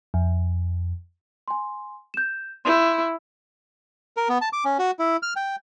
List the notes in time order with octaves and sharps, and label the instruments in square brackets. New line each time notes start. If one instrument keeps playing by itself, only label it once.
[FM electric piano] F2
[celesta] G#5 C6
G6 E7
[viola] E4 [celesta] C6 G6
[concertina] A#4
B3
A5
D6
C#4
F#4
E4
F6
G5